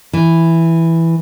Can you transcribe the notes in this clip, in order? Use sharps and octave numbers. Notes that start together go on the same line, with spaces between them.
E3